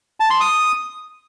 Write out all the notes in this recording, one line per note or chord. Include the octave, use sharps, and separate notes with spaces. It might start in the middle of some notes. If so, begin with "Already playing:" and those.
A5
C6
D#6